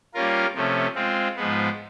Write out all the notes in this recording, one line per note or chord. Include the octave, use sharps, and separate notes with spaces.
G3 A#3 C#4 F4 A#4
C3 F3 A3 C#4
G#3 C4 F4
G#2 F3 G#3 B3